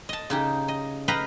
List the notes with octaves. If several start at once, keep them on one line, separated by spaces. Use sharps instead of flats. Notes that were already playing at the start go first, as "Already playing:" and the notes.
D#5 A5
C#3 D#4 G4
D#5
B4 D#5 F5 G5 A#5 B5